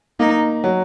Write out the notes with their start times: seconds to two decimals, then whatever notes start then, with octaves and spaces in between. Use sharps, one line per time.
0.20 A#3 D#4
0.64 F#3